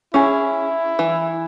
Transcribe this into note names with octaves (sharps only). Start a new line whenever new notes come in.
C#4 E4 G#4
E3